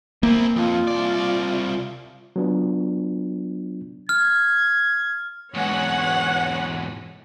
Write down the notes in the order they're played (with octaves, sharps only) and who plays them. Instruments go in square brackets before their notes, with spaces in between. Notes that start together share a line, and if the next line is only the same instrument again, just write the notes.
[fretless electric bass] A#3 [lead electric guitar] C4 E4
[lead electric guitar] F2 [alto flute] F4
[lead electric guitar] C2 D5
[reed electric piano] F#3 B3 D4 F4
[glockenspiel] F6 [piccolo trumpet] G#6
[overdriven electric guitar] E2 G#2 [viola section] C#5 F#5